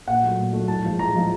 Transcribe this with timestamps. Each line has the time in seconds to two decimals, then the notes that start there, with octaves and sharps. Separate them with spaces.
0.07 A#2 F#5
0.24 F#3 A3
0.38 A#2
0.53 F#3 A3
0.68 A2 A5
0.84 F3 G#3
0.98 A2 A#5
1.14 F3 G#3